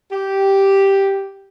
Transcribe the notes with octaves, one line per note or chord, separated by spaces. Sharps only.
G4